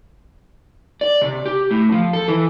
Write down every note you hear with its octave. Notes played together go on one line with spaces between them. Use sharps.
D5
C3
G4
A2
F3
A4
E3